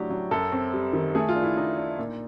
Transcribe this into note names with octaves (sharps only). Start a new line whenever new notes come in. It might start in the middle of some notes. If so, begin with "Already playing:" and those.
Already playing: A2 F#3 D4 G4
F#3
F#2 A4
C4
G3
D#3
A3 G#4
F4
D4
E4
D4 D#4
D4
A#2